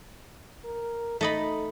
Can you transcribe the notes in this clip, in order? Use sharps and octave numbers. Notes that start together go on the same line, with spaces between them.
A#4
A3 D#4 D#5 B5